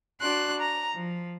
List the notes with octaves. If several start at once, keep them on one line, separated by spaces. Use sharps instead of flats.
D4 F#4 C6 F#6
A#5
F3